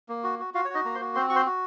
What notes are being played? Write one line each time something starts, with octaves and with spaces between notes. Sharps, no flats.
A#3
F#4
F#4
F4 F#4 F5
C#5
D#4 F#4 D#5
A#3 A#5
C5 C6
F#4
C4 C5 C6
F#4 C#6
C5 C6
F#4